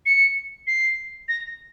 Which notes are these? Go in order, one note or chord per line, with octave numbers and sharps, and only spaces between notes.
C#7
C7
A#6